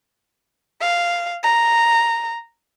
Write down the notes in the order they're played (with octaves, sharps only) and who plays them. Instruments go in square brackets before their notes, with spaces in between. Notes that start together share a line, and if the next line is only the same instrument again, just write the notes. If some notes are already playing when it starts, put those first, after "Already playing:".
[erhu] F5
A#5